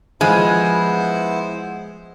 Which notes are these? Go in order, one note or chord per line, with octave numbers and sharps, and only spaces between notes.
F3 G#3 B3 E4 C5